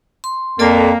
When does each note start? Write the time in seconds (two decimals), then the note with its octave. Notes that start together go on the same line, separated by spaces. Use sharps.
0.24 C6
0.59 F2 A#3 A4 D5 A5